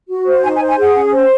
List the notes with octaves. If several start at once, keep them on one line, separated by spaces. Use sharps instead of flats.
F#4
C5
D#4 G#5
G#5
C5
G#5
G#4 F#5
C#4
C5